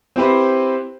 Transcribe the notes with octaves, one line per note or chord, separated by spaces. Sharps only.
C4 E4 G4 B4 C5